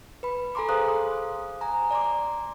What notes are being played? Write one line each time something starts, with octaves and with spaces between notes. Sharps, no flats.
B4 B5
A4 G#5 A#5 C6 D6
G#4 C5 F5 D#6 F#6
G#5 A#5
D5 A#5 C6 D6